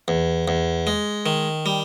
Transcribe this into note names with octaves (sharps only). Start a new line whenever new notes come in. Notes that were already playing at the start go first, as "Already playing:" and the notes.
E2
E2
G#3
D#3
G3